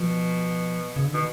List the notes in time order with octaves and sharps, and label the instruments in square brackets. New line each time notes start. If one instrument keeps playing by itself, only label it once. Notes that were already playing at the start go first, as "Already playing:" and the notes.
Already playing: [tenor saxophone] B2 [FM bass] F3
[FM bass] C#3
D3
[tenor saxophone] B2 [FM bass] D#3